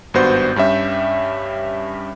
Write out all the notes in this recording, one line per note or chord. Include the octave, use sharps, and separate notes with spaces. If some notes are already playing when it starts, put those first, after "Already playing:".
G#1 G2 B3 F#4 C5 G6
G2 G3 C#4 E5